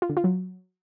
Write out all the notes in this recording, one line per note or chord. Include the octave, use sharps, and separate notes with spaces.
F4
D3
F4
F#3